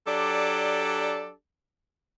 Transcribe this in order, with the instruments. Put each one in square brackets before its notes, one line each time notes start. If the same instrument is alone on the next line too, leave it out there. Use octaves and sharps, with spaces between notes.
[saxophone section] F#3 D4 G4 A4 D5